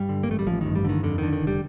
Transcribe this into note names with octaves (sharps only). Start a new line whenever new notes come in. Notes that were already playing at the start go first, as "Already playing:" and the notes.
Already playing: G2 G3
D3
A#3
A1 A3
G3
A1 F3
G2 D#3
G3
D3 D#3
F2 D3
D3 D#3
D#3
F1
G3